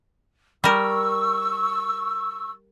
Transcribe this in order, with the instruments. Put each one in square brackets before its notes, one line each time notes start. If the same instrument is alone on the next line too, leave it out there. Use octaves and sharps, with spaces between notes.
[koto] G3 A#4 [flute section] C#6 E6